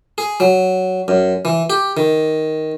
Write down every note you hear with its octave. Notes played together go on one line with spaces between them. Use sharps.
G#4
F#3
F#2
E3
G4
D#3